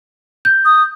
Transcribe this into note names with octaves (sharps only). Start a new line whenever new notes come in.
G6
D#6